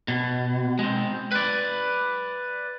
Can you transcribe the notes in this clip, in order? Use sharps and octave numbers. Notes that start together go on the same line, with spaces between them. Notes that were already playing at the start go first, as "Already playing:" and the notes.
B2
G#3 C4
B4 D5